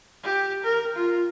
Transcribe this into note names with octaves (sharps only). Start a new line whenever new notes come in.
G4
A#4
F4